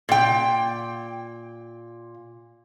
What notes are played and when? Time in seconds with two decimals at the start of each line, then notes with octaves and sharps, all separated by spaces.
0.09 A#2 G5